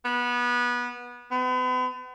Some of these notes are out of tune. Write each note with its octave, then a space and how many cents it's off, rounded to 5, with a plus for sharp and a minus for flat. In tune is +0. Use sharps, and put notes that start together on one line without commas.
B3 -20
B3 +40